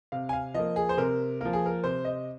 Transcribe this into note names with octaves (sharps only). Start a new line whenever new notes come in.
C3 F5
G#5
F5
F3 A#3 D#5
G#4
C5
C3 A#4
F3 A#3 A#4
G#4
A#4
C3 C5
D#5